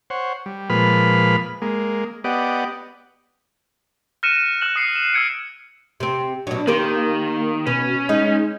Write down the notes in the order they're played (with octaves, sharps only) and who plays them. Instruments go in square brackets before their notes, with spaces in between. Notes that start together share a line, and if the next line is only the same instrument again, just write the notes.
[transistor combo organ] C5 C#5 F#5
G3
A#2 F3 G#3 B4 B5 F6
G#3 A#3
B3 G4 D5 D#5 F#5
[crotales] F6 F#6 A#6 C#7 D#7 E7
F6 F#6 E7 F#7
D#6 C7 C#7
E7
E6 F#6 G#6 C#7 D7
[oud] C3 C4
[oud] B2 F#3 [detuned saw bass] D4
[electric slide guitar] D#3 [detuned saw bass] A#3 [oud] G4 A#4 C5
[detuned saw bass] B2 [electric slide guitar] C#4 [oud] B4
[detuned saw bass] G#3 [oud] D#4